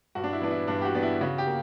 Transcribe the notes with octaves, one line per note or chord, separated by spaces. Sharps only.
G2 F#4
D4
E4
E3 B3 D4
E4
G2 D4
G4
F#4
E3 B3 D4
E4
C#3 F#4
G4
A#3